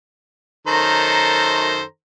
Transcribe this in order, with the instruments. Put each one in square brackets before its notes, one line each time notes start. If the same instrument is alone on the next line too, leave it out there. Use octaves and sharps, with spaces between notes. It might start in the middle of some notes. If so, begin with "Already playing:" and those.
[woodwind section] F#2 A#5 [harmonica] D#3 A4 C5